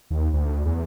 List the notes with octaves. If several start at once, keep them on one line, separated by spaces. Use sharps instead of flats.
D#2
D2
E2